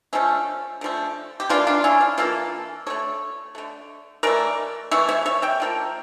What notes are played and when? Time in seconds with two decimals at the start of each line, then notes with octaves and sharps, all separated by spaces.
0.13 D3 F3 A3 C#4 E4
0.81 D3 F3 A3
1.40 G4
1.49 E3 A#3 D4 F4
1.67 D4 F4
1.84 C#4 E4
2.01 D4
2.18 E3 A#3 F4 A4
2.86 D3 A3 A4 C#5
3.55 D3 A3
4.23 E3 A3 A#4 D5
4.91 E3 A3 C#5 E5
5.09 C#5 E5
5.26 C#5 E5
5.42 E5 G5
5.60 D3 F3 A#3